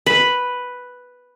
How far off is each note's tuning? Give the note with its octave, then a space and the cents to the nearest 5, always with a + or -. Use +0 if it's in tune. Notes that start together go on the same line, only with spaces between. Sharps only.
B4 +0 B5 +0